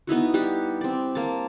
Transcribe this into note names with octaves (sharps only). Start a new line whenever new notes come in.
B3 D#4 E4 F#4
G3 G4 F#5
C4 D5
A#3 A5